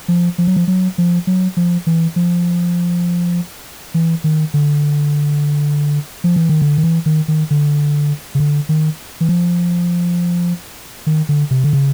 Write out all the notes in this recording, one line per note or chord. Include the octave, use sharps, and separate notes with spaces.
F3
F3
F#3
F3
F#3
F3
F#3
F3
E3
F3
E3
D#3
D3
F3
E3
D#3
D3
D#3
E3
D#3
D#3
D3
C#3
D3
D#3
E3
F3
D#3
D3
C3
D3
C#3